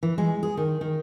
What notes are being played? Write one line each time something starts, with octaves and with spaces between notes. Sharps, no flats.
E3
G#3
G#4
D#3
D#3